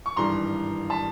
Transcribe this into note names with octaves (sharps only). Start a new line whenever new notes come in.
C#6
G#1 G2 E3 G3 A#5 C6
A5 B5